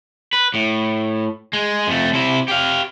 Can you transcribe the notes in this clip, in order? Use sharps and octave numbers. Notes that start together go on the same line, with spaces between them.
B4
A2
G#3
F2 A3
C3 E4
G4 F5